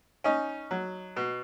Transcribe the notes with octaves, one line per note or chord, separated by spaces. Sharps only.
C#4 D#4
F#3
B2